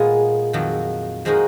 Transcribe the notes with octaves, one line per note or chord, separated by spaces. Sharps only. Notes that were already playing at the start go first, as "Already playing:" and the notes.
Already playing: A#2 G#3 B3 F4 G#4
F2 D#3 F#3
F3 G#3 D#4 F#4 A#4